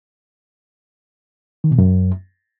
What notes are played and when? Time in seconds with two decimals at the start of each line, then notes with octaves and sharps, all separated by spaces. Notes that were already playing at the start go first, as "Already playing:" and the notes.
1.64 D#3
1.71 B2
1.78 F#2